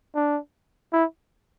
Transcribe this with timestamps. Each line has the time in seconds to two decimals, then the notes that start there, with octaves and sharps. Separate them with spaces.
0.15 D4
0.93 E4